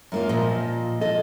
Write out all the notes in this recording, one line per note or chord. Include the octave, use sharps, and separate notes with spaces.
F#2 A#3 F4
A#2 F3 D#5
A4 D#5